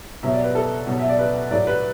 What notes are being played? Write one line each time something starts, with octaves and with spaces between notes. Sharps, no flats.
B2 F#3 E5
D5
B4
A4
B2 F#3
E5
D5
B4
A2 F#3 D5
B4